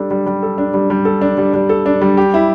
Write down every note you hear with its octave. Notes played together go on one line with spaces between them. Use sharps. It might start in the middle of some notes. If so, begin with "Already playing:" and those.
Already playing: G3 D4 A4
G3
G3
A4
D4
G3
G3
A4
D4
G3
G3
A4
D4
G3
G4
E4